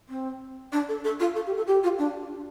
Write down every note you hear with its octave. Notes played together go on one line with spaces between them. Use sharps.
C4
D4
A4
A4
F4
A4
G4
A4
G4
F4
D4